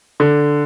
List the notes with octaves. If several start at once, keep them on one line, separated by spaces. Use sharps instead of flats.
D3